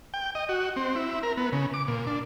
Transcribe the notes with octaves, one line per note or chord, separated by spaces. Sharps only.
G5
D#5
F#4
C4
E4
A#4
B3
C#3
D6
A#2
D4